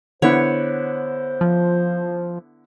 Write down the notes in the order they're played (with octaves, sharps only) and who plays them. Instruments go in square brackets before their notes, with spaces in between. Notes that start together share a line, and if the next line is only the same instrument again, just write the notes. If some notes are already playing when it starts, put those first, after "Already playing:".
[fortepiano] D3 B3 E4 [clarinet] C5 [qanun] C#5
[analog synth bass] F3